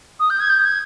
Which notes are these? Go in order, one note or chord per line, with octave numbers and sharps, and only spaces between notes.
D#6
G6
G#6
G6
G#6